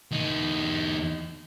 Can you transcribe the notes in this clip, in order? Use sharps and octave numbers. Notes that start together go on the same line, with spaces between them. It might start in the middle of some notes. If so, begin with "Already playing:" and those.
E2 D#4